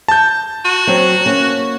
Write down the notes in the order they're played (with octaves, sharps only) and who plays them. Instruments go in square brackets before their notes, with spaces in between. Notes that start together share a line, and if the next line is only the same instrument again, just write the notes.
[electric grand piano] A5 G6
[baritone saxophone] F#4
[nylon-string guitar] F#3 C4
A#3 C#4